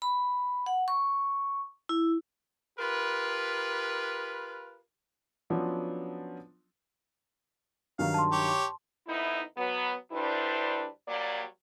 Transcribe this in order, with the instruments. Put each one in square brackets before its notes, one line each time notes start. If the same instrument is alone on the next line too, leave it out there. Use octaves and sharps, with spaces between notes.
[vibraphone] B5
F#5
C#6
E4
[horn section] F4 G4 A#4 B4
[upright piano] F3 F#3 B3 C#4 D4 F4
[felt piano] G2 D#3 F#3 [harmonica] F5
[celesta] A5 C6
[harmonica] G4 C#5
[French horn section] F2 B3 D#4 E4
F#3 B3
D2 G3 D4 E4 B4 C5
F#3 G3 A#3 D5